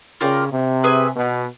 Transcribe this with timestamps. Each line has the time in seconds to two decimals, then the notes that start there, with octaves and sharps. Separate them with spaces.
0.21 C#3 F4 A#4 D5 G5
0.52 C3
0.84 G#4 B4 E5 G#5
1.15 B2